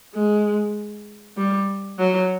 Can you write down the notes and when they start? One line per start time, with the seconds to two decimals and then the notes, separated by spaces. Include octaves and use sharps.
0.14 G#3
1.37 G3
1.99 F#3